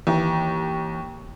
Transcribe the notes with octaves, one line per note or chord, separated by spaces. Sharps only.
D#2 E3